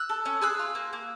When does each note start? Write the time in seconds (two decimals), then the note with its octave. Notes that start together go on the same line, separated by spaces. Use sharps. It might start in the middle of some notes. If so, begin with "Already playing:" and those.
Already playing: E6 F#6
0.09 A4
0.26 C#4
0.42 G#4 E6 F#6
0.59 F4
0.75 A#3
0.93 A#3